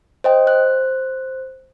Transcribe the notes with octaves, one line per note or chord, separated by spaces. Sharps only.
C5 D#5 G5
C5 F#6